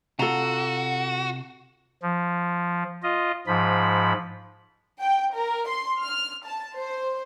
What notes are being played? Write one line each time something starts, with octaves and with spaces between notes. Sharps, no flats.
C3 F4 F#4 A4 F#5 A#5
F3
F4 D#5
G#2 F3 B5
G5
A#4
C6
F6
A5
C5